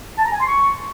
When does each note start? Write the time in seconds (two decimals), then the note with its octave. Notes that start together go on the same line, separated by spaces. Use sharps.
0.18 A5
0.25 A#5
0.33 G#5
0.40 C6
0.48 C#6